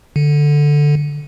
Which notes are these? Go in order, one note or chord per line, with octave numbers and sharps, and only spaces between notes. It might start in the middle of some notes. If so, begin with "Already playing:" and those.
D3